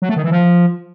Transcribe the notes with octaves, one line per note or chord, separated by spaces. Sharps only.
F#3
A3
D#3
E3
F3